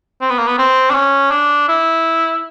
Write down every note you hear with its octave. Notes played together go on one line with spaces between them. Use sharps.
C4
B3
A#3
B3
C4
D4
C#4
D4
E4